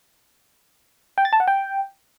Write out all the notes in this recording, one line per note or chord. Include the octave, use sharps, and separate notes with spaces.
G5
A6
A5
F#5
G5